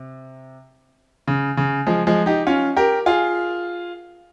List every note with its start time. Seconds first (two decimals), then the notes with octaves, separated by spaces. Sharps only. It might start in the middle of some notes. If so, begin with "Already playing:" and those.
Already playing: C3
1.27 C#3
1.57 C#3
1.87 F3 G#3
2.07 F3 G#3
2.26 D#4 G4
2.47 C#4 F4
2.77 G4 A#4
3.06 F4 G#4